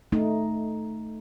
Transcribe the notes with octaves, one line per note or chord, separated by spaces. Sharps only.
A3 D#4